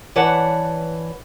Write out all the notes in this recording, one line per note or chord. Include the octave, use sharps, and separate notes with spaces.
E3 B4 C#5 D5 F#5 A5